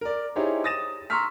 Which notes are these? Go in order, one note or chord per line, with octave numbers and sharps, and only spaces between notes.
A#4 D5
D#4 E4 G4 G#4 C5 C#5
D#6 A6 A#6 D#7 E7
A#5 C6 C#6 E6 F6 B6